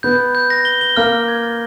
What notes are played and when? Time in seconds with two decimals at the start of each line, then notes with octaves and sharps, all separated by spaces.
0.03 B3 G6
0.19 G6
0.35 G6
0.50 A#6
0.65 G7
0.81 G7
0.96 A#3 F6
1.12 F6
1.28 G#6
1.43 A6